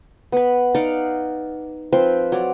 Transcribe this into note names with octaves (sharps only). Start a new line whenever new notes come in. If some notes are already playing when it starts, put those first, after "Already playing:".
B3 B5
D#4 D5 F5 F#5
F3 C4 B4 C5
F#3 D5